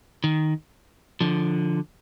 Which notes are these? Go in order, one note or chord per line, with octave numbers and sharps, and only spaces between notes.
D#3
D3 F3